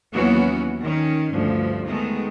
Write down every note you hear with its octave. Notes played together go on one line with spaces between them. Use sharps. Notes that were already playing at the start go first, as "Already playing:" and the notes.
D#2 E3 F#3 B3 C#4 F#4
D#3 C#4
D2 G2 F3
D#3 G#3 A3 B3